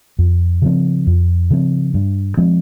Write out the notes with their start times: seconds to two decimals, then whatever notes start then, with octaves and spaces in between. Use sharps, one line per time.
0.19 F2
0.62 C#3 F3 C4
1.07 F2
1.50 C#3 F3 C4
1.94 G2
2.37 F3 G#3 C4